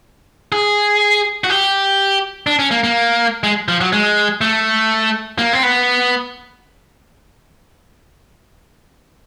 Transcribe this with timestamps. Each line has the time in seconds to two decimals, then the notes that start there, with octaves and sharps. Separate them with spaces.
0.52 G#4
1.44 F#4
1.50 G4
2.47 D4
2.59 C#4
2.71 A#3
2.84 A#3
3.44 G#3
3.68 F3
3.80 F#3
3.92 G#3
4.41 A3
5.38 A#3
5.53 C4
5.63 B3